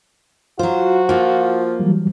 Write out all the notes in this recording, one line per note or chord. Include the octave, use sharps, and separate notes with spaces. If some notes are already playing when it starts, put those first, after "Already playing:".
F#3 F4 F#4 C5
F3 A#3 F4
E3 F#3 G3